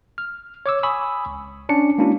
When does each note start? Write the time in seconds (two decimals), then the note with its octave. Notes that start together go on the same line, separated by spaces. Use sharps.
0.18 F6
0.66 C#5 D6 E6
0.83 G#5 B5 C#6 D#6 E6
1.26 C#2
1.69 C#4 D4 C#7
1.98 G#3 A#3 C#4 D4 E4 F#4